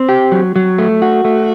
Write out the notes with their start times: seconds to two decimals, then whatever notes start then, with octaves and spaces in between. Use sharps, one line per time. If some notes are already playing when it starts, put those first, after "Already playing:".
Already playing: C4
0.09 G4
0.32 F#3
0.56 F#3
0.79 A3
1.02 F#4
1.25 A3